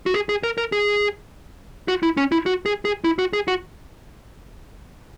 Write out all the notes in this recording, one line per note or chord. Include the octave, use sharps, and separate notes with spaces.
F#4
G#4
G#4
A#4
A#4
G#4
F#4
E4
C#4
E4
F#4
G#4
G#4
E4
F#4
G#4
F#4